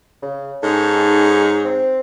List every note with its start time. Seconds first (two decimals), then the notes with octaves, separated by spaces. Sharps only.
0.23 C#3
0.63 G#2 C#4 D#4 A4
1.65 C4